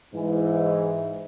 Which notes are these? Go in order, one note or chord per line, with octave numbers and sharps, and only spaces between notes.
G#2 E3